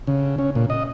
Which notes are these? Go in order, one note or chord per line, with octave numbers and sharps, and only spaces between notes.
C#3
C#4
A#2
D#5